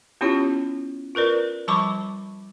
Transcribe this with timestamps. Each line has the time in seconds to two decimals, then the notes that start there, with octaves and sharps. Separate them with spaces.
0.21 B3 C#4 E4 F4 G4 C#5
1.15 F4 A#4 B4 D5
1.68 F3 G3 A5 B5 C#6 D6